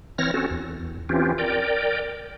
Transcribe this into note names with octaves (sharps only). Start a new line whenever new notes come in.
E3 C4 C#5 F6 A#6
C4 C#4 F#4 A4
E2
E3 C4 C#4 F4 G4
A#4 D5 G5